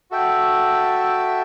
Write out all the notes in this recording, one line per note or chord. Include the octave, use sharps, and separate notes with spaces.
F#4 A4 E5 G5